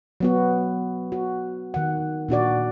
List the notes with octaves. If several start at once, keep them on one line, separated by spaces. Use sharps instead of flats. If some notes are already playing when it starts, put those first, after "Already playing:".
F#3 B3 F#4
F#4
D#3 F#5
A#2 D4 F#4 D5